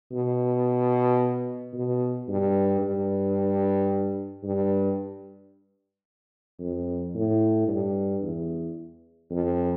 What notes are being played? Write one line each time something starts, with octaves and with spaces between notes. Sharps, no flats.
B2
B2
G2
G2
G2
F2
A2
G2
E2
F2